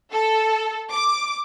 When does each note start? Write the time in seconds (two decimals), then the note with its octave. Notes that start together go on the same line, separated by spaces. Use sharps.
0.12 A4
0.91 D6